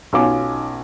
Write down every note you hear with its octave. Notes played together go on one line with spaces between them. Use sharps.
B1 C#4 D#4 F4 G#5 D6